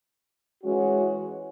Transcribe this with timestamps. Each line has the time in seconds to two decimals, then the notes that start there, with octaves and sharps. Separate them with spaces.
0.64 E3 G#3 C#4 F#4